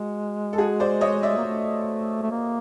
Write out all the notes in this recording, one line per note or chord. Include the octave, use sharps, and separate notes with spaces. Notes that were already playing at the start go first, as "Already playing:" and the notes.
Already playing: G#3 F#4
A4
F#4 G#4
C5 D5
C#5 D#5
D5 E5
A#3
A3
A3
A#3